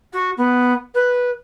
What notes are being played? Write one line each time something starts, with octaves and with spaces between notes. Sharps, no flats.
F#4
B3
B4